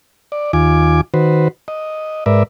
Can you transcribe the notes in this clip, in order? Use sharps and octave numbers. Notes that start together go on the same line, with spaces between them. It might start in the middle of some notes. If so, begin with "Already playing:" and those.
D5
D#2 F4 G#5 D6
D#3 F#4 B4 C5
D#5
G#2 A#4 B4 D5 E5